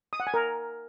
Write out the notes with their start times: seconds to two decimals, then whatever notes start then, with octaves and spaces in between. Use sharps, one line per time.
0.13 D#6
0.20 F#5
0.27 G#5
0.34 A#4